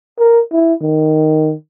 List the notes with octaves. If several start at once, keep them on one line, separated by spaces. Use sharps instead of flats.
A#4
E4
D#3